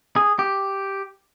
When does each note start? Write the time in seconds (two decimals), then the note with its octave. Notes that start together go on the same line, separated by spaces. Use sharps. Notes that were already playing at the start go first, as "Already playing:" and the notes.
0.16 G#4
0.39 G4